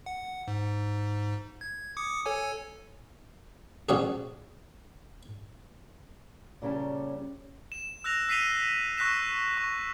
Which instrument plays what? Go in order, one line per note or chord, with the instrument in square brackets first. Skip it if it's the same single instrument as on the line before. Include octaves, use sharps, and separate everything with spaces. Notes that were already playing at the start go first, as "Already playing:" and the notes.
[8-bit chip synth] F#5
G#2
G#6
D6 D#6 C#7
A4 C#5 G#5
[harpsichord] A1 F3 F#4 G#4
[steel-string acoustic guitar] A#2 C#3 G3 C#4 G4 A5
[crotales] E7
E6 F#6 A#6 F7
E6 B6 C7 D#7 F7 G7
C#6 E6 F#6 A#6 B6 E7
C#6